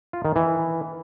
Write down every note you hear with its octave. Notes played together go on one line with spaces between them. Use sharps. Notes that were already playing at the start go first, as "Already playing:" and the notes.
F4
D#3
E3